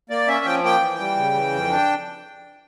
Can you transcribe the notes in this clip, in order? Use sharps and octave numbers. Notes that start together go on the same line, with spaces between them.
A#3 D5
C#4 E5
F3 G5
A#3 G5
E3
G3
C#3
E3
F2
D4